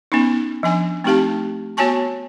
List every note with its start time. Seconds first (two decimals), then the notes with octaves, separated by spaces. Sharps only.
0.12 B3 C#4 D#4
0.63 F3 D4 G#5
1.04 A3 C4 D#4 G4 F5 A5
1.77 B3 F#4 C#5 G#5 A5 C#6